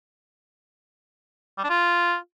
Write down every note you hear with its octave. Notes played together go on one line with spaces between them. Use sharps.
G3
D4
F4